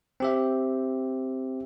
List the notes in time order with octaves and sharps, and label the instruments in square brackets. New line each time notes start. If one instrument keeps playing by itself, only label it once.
[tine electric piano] C4 G4 E5